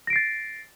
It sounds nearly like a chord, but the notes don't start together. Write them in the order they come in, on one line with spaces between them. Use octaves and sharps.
A#6 D7 C7 A6